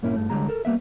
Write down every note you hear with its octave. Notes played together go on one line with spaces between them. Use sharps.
G2 A#2 A#3 C#4 E4
G2 A3
D2 D3 G3 G#3 G#4 A#5
A4 A#4
G3 A#3 B3 E5